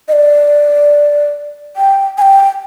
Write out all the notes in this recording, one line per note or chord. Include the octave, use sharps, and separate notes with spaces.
D#5
D5
G5
G#5
G5